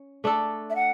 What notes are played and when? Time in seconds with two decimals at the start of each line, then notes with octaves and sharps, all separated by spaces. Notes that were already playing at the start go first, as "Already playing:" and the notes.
Already playing: C#4
0.24 A3 D4 A4
0.70 E5
0.75 F#5